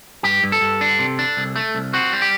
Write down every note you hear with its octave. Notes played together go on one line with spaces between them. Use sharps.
G2 G4
G2
A4
G2
D4
C3
D4
C2
A3
C2
C4 F#4
G3
G4